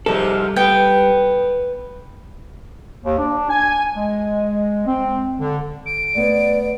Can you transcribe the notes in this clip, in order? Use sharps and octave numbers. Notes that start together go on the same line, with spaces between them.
G#2 C3 F3 G3 A4
B3 G5
D#2
D4
G#5
G#3
C4
D3
D7
A3 B3 C#5 D5